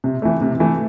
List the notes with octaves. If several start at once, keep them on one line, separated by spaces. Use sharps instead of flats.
C3
E3 A3
C3
E3 A3